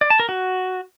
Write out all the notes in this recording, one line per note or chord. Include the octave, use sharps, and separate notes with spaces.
D5
A5
A#4
F#4